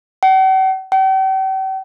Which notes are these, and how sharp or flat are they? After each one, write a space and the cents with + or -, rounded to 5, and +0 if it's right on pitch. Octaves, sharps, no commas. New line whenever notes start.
F#5 +45
G5 -45